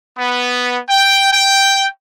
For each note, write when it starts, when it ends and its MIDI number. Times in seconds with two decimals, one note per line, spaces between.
0.17 0.79 59
0.89 1.30 79
1.32 1.87 79